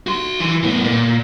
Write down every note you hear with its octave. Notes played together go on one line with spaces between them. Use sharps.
F#4 C6
E3
A2 B3
A#2